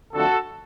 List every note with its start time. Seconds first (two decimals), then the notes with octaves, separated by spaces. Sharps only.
0.14 F2 D3 F3 A3 F#4 A4